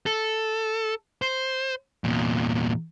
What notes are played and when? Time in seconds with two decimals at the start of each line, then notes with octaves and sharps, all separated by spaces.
0.06 A4
1.22 C5
2.04 E2 A#2